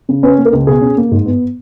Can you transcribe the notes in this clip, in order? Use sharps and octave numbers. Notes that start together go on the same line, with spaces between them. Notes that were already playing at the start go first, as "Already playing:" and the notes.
C#3
C#4 B4
A#3
A#4
C#2
B2 G#4
C#4
A#3
G#2
B3